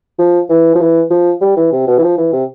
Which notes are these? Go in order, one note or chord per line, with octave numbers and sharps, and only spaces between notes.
F3
E3
F3
E3
F3
G3
E3
C3
B2
E3
F3
E3
C3